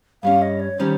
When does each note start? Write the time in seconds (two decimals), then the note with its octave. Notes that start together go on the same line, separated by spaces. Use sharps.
0.23 G2 G3 C#4 F5
0.42 D#5
0.60 C#5
0.78 D#3 G3 C#4 C5